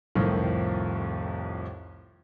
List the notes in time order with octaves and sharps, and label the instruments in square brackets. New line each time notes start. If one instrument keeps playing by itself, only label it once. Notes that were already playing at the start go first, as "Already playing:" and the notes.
[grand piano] C2 F2 A2 D#3 F3